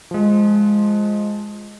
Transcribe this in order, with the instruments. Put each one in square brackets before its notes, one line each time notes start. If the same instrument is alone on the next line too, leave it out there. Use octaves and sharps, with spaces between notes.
[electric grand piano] F3 G#3